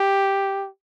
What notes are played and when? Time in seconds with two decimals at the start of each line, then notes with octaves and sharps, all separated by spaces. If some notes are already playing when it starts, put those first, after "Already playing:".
Already playing: G4